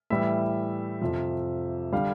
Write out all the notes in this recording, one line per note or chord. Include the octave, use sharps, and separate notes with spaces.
A2 E3 G3 E5
F2 C3 F3
D3 G3 F5